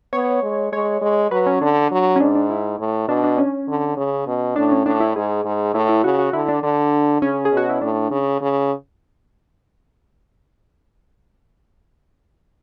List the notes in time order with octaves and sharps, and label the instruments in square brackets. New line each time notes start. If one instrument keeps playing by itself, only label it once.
[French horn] B3 [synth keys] C#5
[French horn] G#3
[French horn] G#3 [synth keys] C#5
[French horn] G#3
[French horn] F#3 [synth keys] B4
[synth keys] C#4
[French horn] D3 [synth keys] D4
[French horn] F#3
[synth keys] C#4
[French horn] G#2 [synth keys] D4
[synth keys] D4
E4
[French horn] A2
[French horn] B2 [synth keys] D4
[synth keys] D4
C#4
[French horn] D3
C#3
B2
[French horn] A2 [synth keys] D4
[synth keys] C#4
[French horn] A2 [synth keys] D4
[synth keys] E4
[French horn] G#2 [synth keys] G#4
[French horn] G#2
[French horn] A2 [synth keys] E4
[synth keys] E4
[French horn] C#3 [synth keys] F#4
[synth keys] F#4
[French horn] D3 [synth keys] E4
[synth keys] D4
[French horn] D3 [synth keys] D4
[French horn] C#3 [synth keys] C#4
[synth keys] G#4
[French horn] B2
[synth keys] F#4
E4
[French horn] A2 [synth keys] D4
[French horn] C#3
C#3